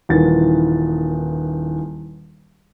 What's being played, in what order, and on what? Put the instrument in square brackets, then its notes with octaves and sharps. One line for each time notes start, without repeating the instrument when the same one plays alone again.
[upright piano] D#1 D#3 E3 B4 A6